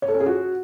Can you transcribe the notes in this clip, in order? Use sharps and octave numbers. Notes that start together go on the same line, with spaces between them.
C#5
A4
C#4
G#4
F#4